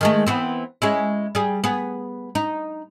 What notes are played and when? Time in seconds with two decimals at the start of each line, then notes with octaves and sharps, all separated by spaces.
0.01 D#3 G#3 A3
0.27 E3 B3 C4
0.82 G#3 C#4 E4
1.35 G3 G#4
1.64 B3 G#4
2.35 D#4